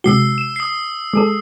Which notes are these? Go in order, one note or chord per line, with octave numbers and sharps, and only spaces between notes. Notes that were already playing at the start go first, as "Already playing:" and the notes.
C3 G#3 F#4 E6 C7 G7
E7
D#6 C7
G#3 G#4 A4